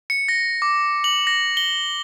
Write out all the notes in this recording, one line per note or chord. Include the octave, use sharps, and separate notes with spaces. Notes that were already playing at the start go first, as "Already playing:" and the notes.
C#7
A#6
D6
F#7
A#6
G7